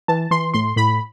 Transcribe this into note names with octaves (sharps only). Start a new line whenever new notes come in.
E3 A5
E3 C6
A2 C6
A2 B5